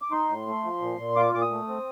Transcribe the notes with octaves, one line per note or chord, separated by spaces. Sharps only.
D6
D#4 C6
A2
A3
F3
A#2
A#2
F4 D6
A#2 D6
D#6
A3
C4